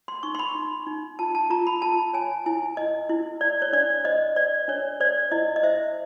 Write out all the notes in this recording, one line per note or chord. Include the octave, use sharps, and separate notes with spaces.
C6
D#4 C#6
C6
B5
D#4
D#4
F4 A5
A5
F4 A#5
B5
F4 A5
C#5 G#5
E4 G#5
E4 D#5
E4
E4 D5
C#5
D4 D5
C5 D#5
C5 D5
D4 C#5
C5 D5
E4 D#5
D#5
C5 E5